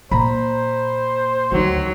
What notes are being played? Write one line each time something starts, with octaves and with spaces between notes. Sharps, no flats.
A#2 C5 A#5 B5
D2 D#3 F#3